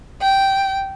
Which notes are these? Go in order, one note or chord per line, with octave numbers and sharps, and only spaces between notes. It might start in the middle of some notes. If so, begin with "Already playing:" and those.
G5